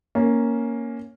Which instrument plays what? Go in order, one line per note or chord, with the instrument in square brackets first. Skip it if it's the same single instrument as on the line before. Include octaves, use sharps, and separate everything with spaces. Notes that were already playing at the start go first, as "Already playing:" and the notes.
[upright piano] A#3 C#4